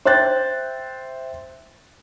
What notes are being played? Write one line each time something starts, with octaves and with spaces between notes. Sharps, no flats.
C5 E5 G5 F#6 G6 A6